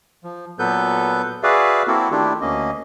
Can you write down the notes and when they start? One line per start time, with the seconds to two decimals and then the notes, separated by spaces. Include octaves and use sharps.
0.24 F3
0.59 A#2 F#3 B3 A4 B4 G6
1.43 F#4 G#4 B4 D5 E5 F5
1.88 A#3 C4 E4 F#4 A4 A#4
2.11 D#3 A3 D4 E4 F4 G4
2.41 D2 A#3 C#4 D#5